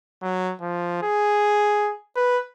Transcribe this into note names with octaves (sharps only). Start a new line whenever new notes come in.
F#3
F3
G#4
B4